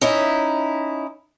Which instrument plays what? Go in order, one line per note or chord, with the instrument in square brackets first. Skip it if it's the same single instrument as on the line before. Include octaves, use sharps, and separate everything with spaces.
[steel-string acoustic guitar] C#4 D#4 E4